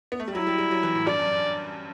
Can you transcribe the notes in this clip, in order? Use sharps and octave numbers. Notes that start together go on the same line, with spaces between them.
B3
A3
G3
F#3 E4
G3
G3
F#3
E3
A2
G2 D5
F#2